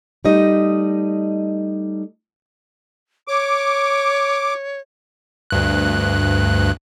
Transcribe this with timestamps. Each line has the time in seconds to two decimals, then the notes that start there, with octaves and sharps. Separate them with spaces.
0.25 G3 A3 D#4 D#5
3.28 C#5 D6
5.50 D2 G2 F#6